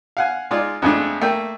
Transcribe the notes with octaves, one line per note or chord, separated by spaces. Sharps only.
F5 F#5 G#5
G#3 D#4 F4 D5
F2 G#3 A3 D4
A3 A#3 G5